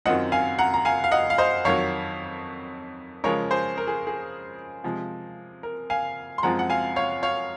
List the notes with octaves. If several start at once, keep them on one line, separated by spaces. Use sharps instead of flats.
F#2 D#3 F#3 C4 F4 D#5 F#5
F5 G#5
F#5 A#5
A#5
F5 G#5
F5
D#5 F#5
F5
C5 D#5
F2 D#3 F#3 C#5 F5
C#3 F3 G#3 A#4 C#5
G#4 C5
A#4
G#4
G#4
C3 F3 G#3
A#4
F5 G#5
C6
F#2 F3 G#3 C4 F4 F#5 A#5
F#5
F5 G#5
C#5 F5
C#5 F5